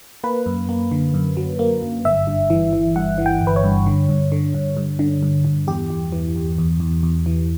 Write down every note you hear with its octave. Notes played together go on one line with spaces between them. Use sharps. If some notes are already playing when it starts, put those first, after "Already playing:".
A#3 B4
F#2
A#3
D3
F#2
F#3
A#3
F#2
G1 E5
G2
E3
E3
G2 F#5
E3
G5
G1
B4
C#5
G2
D3
G2
D3
G2
G2
D3
G2
G2
E2 G4
E2
E3
E2
E2
E2
E2
E3